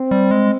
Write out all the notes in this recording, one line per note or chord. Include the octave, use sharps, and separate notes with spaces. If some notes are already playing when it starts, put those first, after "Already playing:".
Already playing: C4
G3
G#3